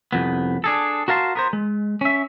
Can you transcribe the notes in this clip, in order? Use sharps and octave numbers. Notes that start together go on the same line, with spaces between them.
C2 F2 B3
D4 G#4 A4
F#4 A#4 F5 A5 C6
B3 A#4 C5
G#3
C#4 E5